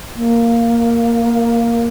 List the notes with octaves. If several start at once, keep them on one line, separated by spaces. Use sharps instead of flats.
A#3